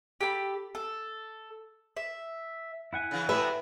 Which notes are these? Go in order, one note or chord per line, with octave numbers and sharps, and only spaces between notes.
G4 A4 A5 B5
A4
E5
E4 F#5 G#5
C#3 E3
A2 C3 G3 B4 E5